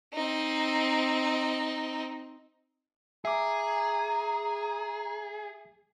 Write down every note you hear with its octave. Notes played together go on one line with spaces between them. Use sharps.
C4 D#4
G#4 E5 A#5 D6